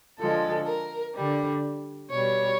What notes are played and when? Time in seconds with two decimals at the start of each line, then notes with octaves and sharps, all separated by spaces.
0.18 D3 F3 G#3 A4
0.66 A#4
1.14 G3
1.19 D3
2.10 B2 G3 C#5